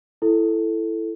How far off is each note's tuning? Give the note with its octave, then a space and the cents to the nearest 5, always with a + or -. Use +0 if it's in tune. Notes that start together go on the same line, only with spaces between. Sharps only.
E4 +10 A4 +0